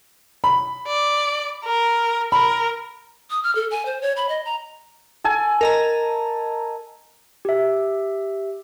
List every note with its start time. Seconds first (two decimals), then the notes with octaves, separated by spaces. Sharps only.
0.44 B5
0.88 D5
1.65 A#4
2.32 A#4 B5
3.30 D#6
3.43 F6
3.55 A4
3.71 G#5
3.86 C5
4.02 C#5
4.17 B5
4.29 D#5
4.45 A#5
5.24 A4 G#5
5.61 A#4 D#5 A#5
7.45 G4 E5